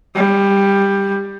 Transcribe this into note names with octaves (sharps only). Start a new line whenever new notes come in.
G3